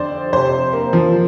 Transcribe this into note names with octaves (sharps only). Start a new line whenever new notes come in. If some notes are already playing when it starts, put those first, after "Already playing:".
Already playing: F2 D3 C5 D5
F2 C3 C5
A#3
F3